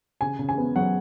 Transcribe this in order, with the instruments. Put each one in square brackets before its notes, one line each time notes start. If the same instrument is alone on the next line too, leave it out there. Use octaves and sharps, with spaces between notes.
[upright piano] C#3 G#5
C#3
G#5
B3
F#3 F#5